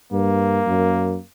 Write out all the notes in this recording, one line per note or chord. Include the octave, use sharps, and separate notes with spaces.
G2 A#3
F#2